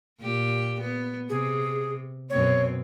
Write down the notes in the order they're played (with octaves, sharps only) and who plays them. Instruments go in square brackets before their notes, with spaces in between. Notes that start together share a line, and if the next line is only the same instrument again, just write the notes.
[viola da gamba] A#2 G4
B3
[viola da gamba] C3 [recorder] G#4
[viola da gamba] F#2 B2 C4 [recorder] C#5